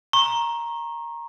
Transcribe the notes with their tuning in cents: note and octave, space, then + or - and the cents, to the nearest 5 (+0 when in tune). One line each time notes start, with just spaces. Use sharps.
A#5 +5 C#6 -35